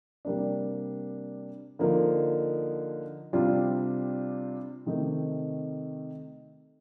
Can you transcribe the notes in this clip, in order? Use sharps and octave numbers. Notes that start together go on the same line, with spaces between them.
C3 G3 A#3 D4
D3 F3 A#3 D#4
C3 G3 D4 F4
C3 D#3 A3 D#4